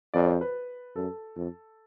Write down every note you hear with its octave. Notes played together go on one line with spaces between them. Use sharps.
F2 D5
C5
B4
F#2 A4
F2